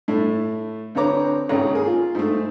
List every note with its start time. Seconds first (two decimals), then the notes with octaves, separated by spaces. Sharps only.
0.08 A2 A3
0.95 D2 C4 B4 C#5 A#5 D6
1.49 G#1 C#2 C#3 C#5 A#5
1.74 A#3 G#4
1.86 F4
2.15 G#2 A3